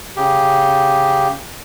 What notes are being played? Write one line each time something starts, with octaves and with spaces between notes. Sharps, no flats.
C#3 G4